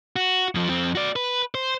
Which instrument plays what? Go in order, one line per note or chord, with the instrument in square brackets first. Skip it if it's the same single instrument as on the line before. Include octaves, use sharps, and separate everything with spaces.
[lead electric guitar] F#4
F2 F3
F2 C4
F#4 D5
B4
C5